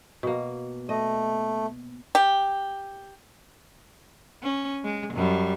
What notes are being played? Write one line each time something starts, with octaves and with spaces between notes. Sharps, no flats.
B2 A#3
A3 D#5
G4
C#4
G#3
F#2 G3